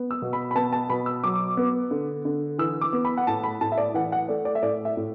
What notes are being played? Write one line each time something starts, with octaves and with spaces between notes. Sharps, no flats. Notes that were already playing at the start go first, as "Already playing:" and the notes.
Already playing: B3
E6
B2
B5
B5
B3 A5
A5
B2 B5
E6
F#3 D6
B3
D3
D3
E3 E6
D6
B3
B5
F#5
A2 A5
B5
A2 A5
E5
D5
E3 F#5
F#5
A3 D5
D5
E5
A2 D5
E5
A2